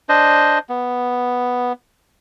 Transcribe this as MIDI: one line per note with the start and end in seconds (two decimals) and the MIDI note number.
0.09 0.59 62
0.09 0.59 72
0.09 0.59 75
0.69 1.73 59